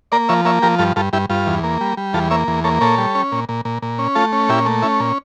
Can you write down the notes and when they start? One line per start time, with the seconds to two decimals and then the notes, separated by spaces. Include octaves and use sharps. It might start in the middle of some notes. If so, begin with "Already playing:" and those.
0.12 A#3 A#4 D5
0.29 F3 C#5 E5
0.45 A#3 C#5 E5
0.62 F3 G4 A#4
0.79 G2 F4 A4
0.96 G2 F4 A4
1.13 G2 E4 G4
1.30 G2 F4
1.47 E2
1.64 A#3
1.81 G3
1.97 G3
2.13 E2 F4 A4
2.31 A#3 C#5 E5
2.48 E2
2.64 A#3 A4 C#5
2.81 A#2 A4 C#5
2.98 G3
3.15 C#4
3.32 A#2
3.49 A#2
3.65 A#2
3.82 A#2
3.99 C#4
4.15 A3 F4 A4
4.32 C#4
4.49 A#2 E4 G4
4.66 A3
4.82 C#4 E4
5.00 A#2